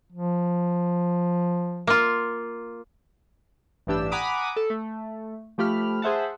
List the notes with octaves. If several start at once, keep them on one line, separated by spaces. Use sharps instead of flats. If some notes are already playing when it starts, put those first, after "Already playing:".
F3
A#3 F4
A1 G2 E3 D4 G4 E6
F#5 G#5 A#5 B5 D6 D#6
A4
A3
F3 A3 G4 B5 F6
G#4 C5 E5 F#5 A5